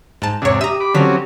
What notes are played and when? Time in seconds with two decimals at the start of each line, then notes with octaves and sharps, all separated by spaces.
0.22 G#2 A5
0.42 E2 G#2 C3 D4 C#5
0.61 G4 E5 A#5 D#6
0.80 B5 D6
0.94 D3 F3 F#3 C4 C#4 B6